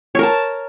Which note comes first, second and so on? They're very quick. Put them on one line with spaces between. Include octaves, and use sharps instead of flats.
C#5 A#4 A5